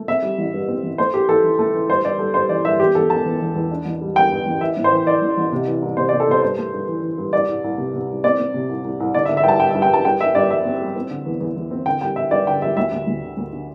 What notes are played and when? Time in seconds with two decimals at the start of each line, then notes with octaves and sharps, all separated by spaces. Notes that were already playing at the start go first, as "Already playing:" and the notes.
Already playing: A3
0.08 C4 E5
0.22 G3
0.38 A1
0.54 G2
0.68 C4
0.83 A1
0.98 A3 C5
1.14 A3 G4
1.28 E3 A4
1.44 E3
1.59 A3
1.74 E3
1.89 G2 C5
2.04 G2 D5
2.19 G3 A4
2.34 G2 C5
2.49 E3 D5
2.65 G2 E5
2.80 E1 G4
2.95 E1 A4
3.10 E1 A5
3.25 E2
3.41 E1
3.55 E2
3.71 D4
3.85 A1
4.01 G3
4.15 G3 G5
4.31 G2
4.46 A1
4.61 E3 E5
4.77 A2
4.84 C5
4.92 E3
5.06 E3 D5
5.22 A1
5.37 A1
5.52 C3
5.67 E3
5.82 C2
5.97 C3 C5
6.09 D5
6.13 C3
6.20 A4
6.28 C3 C5
6.42 G2 C5
6.57 A3
6.73 G2
6.88 E3
7.03 E3
7.18 G2
7.33 C2 D5
7.48 C2
7.64 C2
7.78 C3
7.94 C3
8.09 C2
8.24 C4 D5
8.39 C4
8.54 C3
8.69 C2
8.84 C2
9.00 C2
9.14 D3 D5
9.25 E5
9.29 D3
9.37 E5
9.44 G2 G5 A5
9.59 G2 G5
9.71 E5
9.74 G2
9.82 G5
9.90 G2 A5
10.05 G2 G5
10.20 G3 E5
10.35 G2 D5
10.51 G3 E5
10.65 C4
10.81 G3
10.96 C4
11.10 D3
11.25 E2
11.40 E2
11.56 E2
11.71 C4
11.86 D3 G5
12.01 G3 G5
12.16 D3 E5
12.31 G2 D5
12.47 D3 G5
12.62 G3 E5
12.77 D2 E5
12.92 D2
13.07 D2
13.23 D3
13.37 D2
13.53 D3